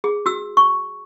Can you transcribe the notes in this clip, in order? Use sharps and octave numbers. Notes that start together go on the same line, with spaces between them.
G#4
F#4 E6
C#6